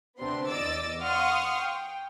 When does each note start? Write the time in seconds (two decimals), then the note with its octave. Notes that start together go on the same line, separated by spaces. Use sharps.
0.19 D2 C3 B3 C4 D4 C6
0.48 E2 D5 D#5 D6 E6 A6
1.01 F5 F#5 C6 C#6 D#6 F6
1.60 G5